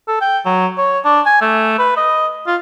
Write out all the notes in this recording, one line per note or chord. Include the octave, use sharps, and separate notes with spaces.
A4
G5
F#3
C#5
D4
G#5
A3
B4
D#5
F4